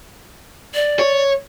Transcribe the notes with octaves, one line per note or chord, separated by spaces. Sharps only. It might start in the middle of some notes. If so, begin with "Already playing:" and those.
D5
C#5